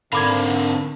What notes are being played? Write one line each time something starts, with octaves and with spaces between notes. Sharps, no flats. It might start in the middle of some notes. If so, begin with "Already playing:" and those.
G#2 D3 C4 A#4 F5 B5 D6 G#6